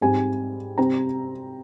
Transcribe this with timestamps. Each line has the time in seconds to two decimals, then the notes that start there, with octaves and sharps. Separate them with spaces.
0.01 G#2 G3 C4 G#5
0.78 C3 G3 C4 A#5